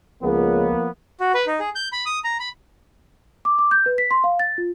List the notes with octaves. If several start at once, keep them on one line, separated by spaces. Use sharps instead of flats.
C#2 F3 A#3 B3
F#4
B4
D#4
G#4
G6
B5
D#6
A#5
B5
D6
D6
G6
B4
B6
C6
F5
A6
F4